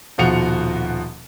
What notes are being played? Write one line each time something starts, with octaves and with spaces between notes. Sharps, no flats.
D#1 B2 F3 F#4 C#7 F7